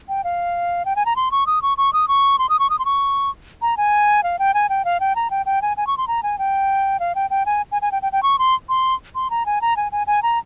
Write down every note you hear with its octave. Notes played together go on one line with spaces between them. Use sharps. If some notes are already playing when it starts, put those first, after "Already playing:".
G5
F5
G5
G#5
A#5
C6
C#6
D#6
C#6
C#6
D#6
C#6
C6
D#6
C#6
D#6
C6
C#6
A#5
G#5
F5
G5
G#5
G5
F5
G5
A#5
G5
G5
G#5
G#5
C#6
C6
A#5
G#5
G5
F5
G5
G5
G#5
G#5
G#5
G5
G5
G5
C#6
C6
C6
C6
A#5
G#5
A#5
G#5
G#5
G#5
A#5